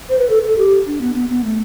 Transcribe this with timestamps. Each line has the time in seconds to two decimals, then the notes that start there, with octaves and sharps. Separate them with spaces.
0.10 C5
0.19 B4
0.30 A4
0.43 A4
0.58 G4
0.86 D4
1.01 B3
1.15 B3
1.30 B3
1.44 A3